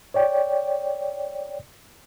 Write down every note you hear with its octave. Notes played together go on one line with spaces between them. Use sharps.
C#5 D5 G5